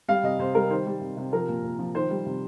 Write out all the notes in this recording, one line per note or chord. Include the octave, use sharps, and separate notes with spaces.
G3 F5
C3 D#5
C3 C5
G3 A#4
D#3 C5
G3
C3
C3
F3 A#4
A#2
A#2
F3
D#3 C5
G3
C3